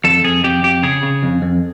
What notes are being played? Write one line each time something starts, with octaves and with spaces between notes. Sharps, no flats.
F2 A4
F2 G#4
F2 G4
F2 G4
C#3 G#4
C#3
F2
F2